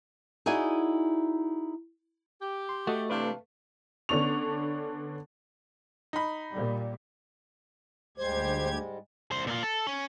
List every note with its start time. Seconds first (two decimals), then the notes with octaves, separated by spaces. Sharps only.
0.46 D#4 E4 F#4 G#4 D5 G#5
2.41 G4
2.69 C6
2.87 A3 F#4 A4 D#5
3.10 C3 E3 D4 B4 F5 A5
4.09 D3 B3 C#4 D4 C#6 F7
6.13 D#4 B5
6.51 A#2 G3
8.18 D2 G#2 G3 G#3 G4 C5 G#6
9.31 C2 C5
9.47 A#2 F4
9.63 A4
9.87 C#4